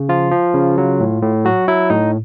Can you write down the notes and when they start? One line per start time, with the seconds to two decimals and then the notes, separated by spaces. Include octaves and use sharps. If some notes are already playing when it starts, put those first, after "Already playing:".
Already playing: C#3
0.09 F3 F4
0.31 F3
0.54 C#3
0.78 F#3
1.00 A2
1.22 A2
1.44 F#3 F#4
1.68 F#3 E4
1.90 A2 D#4